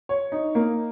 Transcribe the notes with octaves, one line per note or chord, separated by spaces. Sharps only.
C#5
D#4
A#3